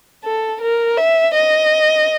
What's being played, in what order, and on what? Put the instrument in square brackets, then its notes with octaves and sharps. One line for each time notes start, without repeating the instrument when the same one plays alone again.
[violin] A4
A#4
E5
D#5